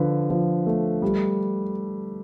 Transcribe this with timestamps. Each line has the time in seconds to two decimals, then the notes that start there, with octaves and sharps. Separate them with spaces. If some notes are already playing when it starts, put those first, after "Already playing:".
Already playing: D3 F3 B4
0.30 F3
0.66 A3
1.02 G3